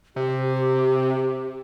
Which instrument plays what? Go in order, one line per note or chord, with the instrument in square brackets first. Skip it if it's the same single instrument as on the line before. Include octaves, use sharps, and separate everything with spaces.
[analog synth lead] C3 [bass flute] G4